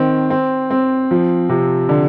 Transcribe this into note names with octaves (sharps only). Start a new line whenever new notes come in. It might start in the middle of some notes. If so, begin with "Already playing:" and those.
Already playing: D#3 C4
C4
C4
F3
C3
D3